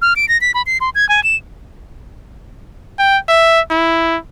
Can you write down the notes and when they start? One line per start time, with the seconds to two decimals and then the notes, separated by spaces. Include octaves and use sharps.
0.02 F6
0.16 D7
0.28 A#6
0.41 B6
0.54 B5
0.66 C7
0.81 C6
0.95 G#6
1.09 G#5
1.24 E7
2.99 G5
3.28 E5
3.71 E4